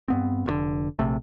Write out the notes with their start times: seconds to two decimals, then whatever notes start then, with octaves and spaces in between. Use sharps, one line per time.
0.08 G2 B3 C4
0.46 F1 A#2 D3
0.99 A#1 C3 A3